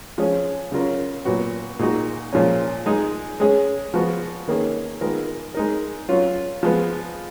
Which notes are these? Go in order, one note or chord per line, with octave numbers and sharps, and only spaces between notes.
F3 G#3 C#4 G#4
C#3 F#3 C#4 F4 A#4
A#2 F#3 B3 F#4
A#2 G#3 D#4 F#4
A#2 F3 G#3 C#4
G#3 D#4 G#4
G#3 C#4 G#4
F3 G#3 B3 F#4
D#3 A#3 C#4 G#4 B4
D#3 G#3 B3 F4 A#4
G#3 D#4 A#4
F#3 C#4 F4
F3 G#3 B3